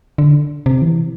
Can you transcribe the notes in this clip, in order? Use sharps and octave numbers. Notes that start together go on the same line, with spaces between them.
D3
C3
E3